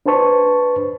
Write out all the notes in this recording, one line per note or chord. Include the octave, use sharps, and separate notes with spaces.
D4 B4 C5 A5 C#6